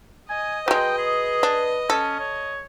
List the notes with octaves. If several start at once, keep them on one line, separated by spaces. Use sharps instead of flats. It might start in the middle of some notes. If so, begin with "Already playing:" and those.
D#5 G#5
F#3 G#3 B4 G5
G#4
D4
C#4 A4
C#5